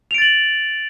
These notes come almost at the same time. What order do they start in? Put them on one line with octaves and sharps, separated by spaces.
F7 D7 A6 F#7